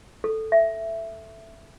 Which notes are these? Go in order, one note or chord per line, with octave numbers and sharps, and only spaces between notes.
A4
E5